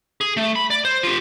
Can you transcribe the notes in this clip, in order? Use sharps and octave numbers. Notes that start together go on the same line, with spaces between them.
G#4
A3
B5
D5
C5
F4 G4